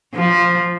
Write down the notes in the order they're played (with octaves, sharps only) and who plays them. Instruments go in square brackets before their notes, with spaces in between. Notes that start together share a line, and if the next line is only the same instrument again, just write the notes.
[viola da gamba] F3